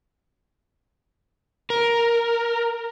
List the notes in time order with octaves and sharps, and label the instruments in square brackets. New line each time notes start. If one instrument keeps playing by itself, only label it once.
[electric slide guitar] A#4